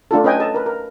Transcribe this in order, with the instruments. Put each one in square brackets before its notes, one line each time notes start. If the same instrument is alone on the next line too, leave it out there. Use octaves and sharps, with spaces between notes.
[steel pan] A3 D4 F4 A4
C#4 B4 D#5 G5 G#5
A4 D#5 A5
A#4 B4
A#4